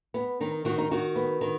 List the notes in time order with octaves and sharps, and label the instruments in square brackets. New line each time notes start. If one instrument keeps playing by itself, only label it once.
[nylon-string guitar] B3
D#3 D#4
D#3 F#4
D#4
D#3 F#4
B3
D#3